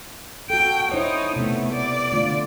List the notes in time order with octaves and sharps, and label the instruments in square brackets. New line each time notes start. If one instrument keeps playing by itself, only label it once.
[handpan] F#4 A4 [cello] G5
[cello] D#4 [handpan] E4 C5 C#5
[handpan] C3 B3 [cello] A3
[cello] D5
[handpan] D3 A3 F4